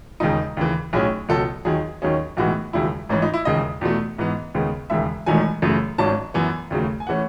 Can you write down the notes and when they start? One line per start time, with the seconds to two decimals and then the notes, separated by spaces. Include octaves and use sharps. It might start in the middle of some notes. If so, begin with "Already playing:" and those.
0.20 E1 D#2 C#3 D#4
0.57 D#2 C#3 E3
0.93 B1 A2 F#3 C#4 G#4
1.29 C#2 B2 F#3 A4
1.65 D#2 D#3 F#3 G#4
2.02 D#2 D#3 F#3 C#4 G#4
2.37 B1 A2 E3 G#3 B3 F#4
2.73 E1 D#2 C#3 F#3 E4
3.09 A1 G#2 E3 C#4
3.22 D#4
3.34 E4
3.45 E1 D#2 C#3 D#5
3.81 E2 B2 A3
4.18 G#2 E3 B3
4.54 D#2 C#3 G#3 B3
4.90 E1 D#2 C#3 E5
5.26 E1 E2 D#3 F#3 A3 G#5
5.62 F#2 C#3 E3 A3
5.98 G#1 G#2 D#3 F#3 C#4 A5
6.34 F#2 E3 B3 G#5
6.71 D#2 C#3 F#3 A3
7.00 G#5
7.07 E3 A3 C#4 F#5